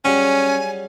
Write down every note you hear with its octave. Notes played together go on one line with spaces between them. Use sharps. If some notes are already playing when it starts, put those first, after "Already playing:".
F#3 G3 C#4 G#4 G#5